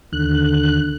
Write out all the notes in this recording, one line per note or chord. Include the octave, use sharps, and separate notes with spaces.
D#2 D3 F#6